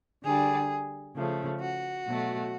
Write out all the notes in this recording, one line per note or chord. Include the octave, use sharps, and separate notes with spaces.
D3 G3 G#4
C#3 F3 A3
F#4
B2 F#3 A3